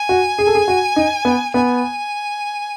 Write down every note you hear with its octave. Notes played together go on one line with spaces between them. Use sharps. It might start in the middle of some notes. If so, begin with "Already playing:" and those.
Already playing: G#5
F#4
G#4
A4
G#4
F#4
D#4
B3
B3 G#5